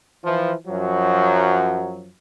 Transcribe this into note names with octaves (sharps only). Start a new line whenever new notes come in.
E3 F3
F#2 F3 F#3